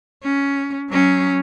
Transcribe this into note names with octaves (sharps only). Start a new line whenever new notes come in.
C#4
F#3 C#4